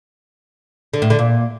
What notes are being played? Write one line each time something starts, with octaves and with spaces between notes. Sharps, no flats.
D3
A2
D3
A#2